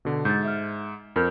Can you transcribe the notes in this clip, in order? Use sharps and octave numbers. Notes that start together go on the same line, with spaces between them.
B2 D3
G#2 G6 A6
E5 F6
F2 A#4 F6 G6